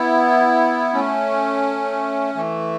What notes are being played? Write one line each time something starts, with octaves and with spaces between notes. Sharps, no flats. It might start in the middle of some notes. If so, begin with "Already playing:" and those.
Already playing: B3 E4
A3 C#4
E3 A3